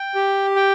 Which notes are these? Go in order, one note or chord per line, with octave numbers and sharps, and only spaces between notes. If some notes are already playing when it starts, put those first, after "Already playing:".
Already playing: G5
G4
G5